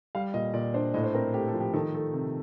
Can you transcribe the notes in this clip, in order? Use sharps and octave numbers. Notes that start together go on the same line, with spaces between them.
G3 F5
A#2 D#5
A#2 D5
D4 C5
A2 D#5
C5
C4 A#4
A3 G4
A4
F3
G4
D#3 A4
A3 A4
C3